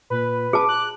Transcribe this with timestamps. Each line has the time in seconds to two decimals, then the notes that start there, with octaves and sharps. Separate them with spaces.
0.10 A#2 B4
0.53 G#4 A5 D6
0.69 F#6